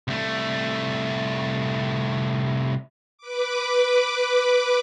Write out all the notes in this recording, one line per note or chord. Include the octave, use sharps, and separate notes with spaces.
C2 A3
B4 D6